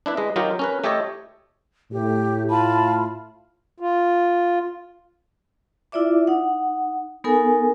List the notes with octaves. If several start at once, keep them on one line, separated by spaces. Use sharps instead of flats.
D4 E4 B4
G#3 B4 D#5
F#3 D#4 F4 G4 A#4
C#4 A#4 B4
A3 G4 A4 C#5 D#5
A2 G4
F4 A5 B5
F4
E4 F4 D5 E5 D6
D#4 F#5
B3 D#4 A4 A#4 G#5